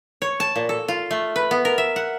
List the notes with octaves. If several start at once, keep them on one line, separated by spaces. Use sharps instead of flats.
C#5
A5
A#2
A4
F4
A3
B4
B3
A#4
E5
F#5